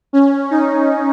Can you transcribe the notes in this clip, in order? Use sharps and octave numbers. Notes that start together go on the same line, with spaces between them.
C#4
D#4